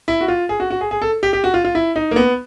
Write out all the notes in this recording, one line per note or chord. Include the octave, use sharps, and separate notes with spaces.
E4
F#4
F4
G#4
F#4
F#4
G#4
G#4
A4
G4
G4
F#4
F4
F4
E4
D#4
A#3
B3